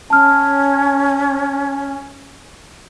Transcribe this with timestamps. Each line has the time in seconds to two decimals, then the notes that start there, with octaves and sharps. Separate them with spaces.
0.10 C#4 A5 F6